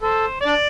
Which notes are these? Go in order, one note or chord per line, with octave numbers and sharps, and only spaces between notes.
A4 C5
D4 D5